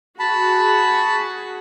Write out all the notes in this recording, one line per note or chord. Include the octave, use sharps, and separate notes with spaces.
F#4 G#4 A5 B5